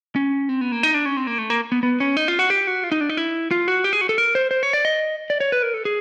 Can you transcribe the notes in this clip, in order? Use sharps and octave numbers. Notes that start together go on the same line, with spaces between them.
C#4
C4
B3
A#3
D#4
D4
C#4
C4
A#3
A3
A#3
B3
B3
C#4
D#4
F4
F#4
G4
F#4
F4
D#4
D4
D#4
E4
F4
F#4
G4
G#4
F#4
A4
A#4
C5
C5
C#5
D5
D#5
D5
C#5
B4
A#4
A4
G#4